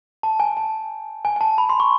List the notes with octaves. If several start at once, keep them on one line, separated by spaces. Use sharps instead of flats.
A5
G#5
A5
G#5
G#5
A5
B5
C6
C#6